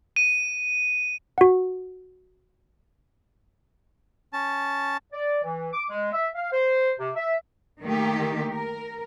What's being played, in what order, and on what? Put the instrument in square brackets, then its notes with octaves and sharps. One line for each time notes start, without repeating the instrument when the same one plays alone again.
[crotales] D#7
[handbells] F#4 F#5
[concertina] C#4 A5
[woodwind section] D5
E3
D6
G#3
E5
F5
C5
C3
E5
[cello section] D#3 A3 A#3 G4
A#4